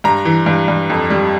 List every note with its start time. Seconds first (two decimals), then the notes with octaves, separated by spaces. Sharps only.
0.04 G2 A#5
0.25 E3
0.46 G2
0.68 G2
0.90 F2
1.10 G3